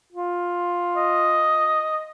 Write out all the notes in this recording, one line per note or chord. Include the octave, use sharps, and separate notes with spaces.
F4
D#5